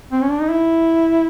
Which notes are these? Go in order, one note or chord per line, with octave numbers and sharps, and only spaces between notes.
C4
C#4
D4
D#4
E4